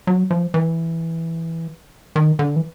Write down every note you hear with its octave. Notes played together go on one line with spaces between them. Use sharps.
F#3
F3
E3
D#3
D3
E3